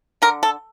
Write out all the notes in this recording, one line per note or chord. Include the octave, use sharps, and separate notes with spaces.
D3 A#4
A4